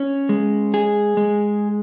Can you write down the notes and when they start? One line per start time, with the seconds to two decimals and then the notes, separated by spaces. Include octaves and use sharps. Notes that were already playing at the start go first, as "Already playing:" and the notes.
Already playing: C#4
0.29 G#3
0.74 G#4
1.17 G#3